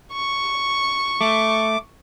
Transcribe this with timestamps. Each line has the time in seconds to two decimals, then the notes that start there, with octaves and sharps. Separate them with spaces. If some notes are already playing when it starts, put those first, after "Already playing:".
0.13 C#6
1.21 A3 D6